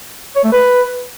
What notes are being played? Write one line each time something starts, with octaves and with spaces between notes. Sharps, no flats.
C#5
A3
B4